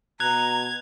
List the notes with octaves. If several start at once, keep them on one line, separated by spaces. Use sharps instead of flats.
B2 A#5 F#6 G#6 F7